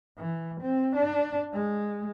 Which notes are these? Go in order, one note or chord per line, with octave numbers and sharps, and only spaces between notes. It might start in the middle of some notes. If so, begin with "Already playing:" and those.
E3
C4
D4
G#3